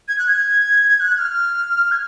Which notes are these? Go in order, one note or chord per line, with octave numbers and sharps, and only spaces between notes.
G#6
F#6
G#6
F#6
F#6
F6
G#6